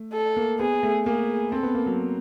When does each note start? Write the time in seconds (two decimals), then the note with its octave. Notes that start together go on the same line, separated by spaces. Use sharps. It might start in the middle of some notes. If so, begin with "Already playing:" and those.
Already playing: A3
0.13 A4
0.36 A#3
0.60 B3 G#4
0.83 A3
1.06 A#3 G#4
1.52 C4 A4
1.63 B3
1.75 A#3
1.86 F#3